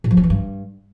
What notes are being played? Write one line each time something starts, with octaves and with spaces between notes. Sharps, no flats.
A2
F3
C#4
E3
G2